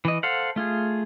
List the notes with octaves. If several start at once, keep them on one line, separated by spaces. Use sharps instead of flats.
E3 D#5
A4 C5 F5 F#5
A3 F4 G#4